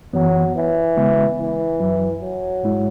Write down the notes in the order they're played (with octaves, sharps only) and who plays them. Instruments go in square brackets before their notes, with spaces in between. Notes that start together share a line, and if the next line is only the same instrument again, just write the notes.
[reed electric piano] F#2 E3 B3 [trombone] F#3
[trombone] E3
[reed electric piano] C#3 G#3 B3
[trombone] E3
[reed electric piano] F#2 F#3 E4
[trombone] F#3
[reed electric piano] G#2 G#3 E4